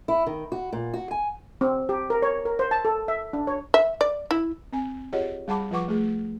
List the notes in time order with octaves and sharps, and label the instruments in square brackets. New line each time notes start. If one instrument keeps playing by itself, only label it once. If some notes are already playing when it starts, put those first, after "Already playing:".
[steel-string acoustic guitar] E4
D#3
F#4
A#2
F#4
G#5
[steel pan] C4
G4
A#4
C#5
A#4
C5
A5
A4
E5
D4
C#5
[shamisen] E5
D5
E4
[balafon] C4 G#5
F4 G4 G#4 C#5 D#5 F#5
G3 G#4 F#5 A5 B5 D6
F3 F4 B4 F#5 C#6 D6
A3 G#4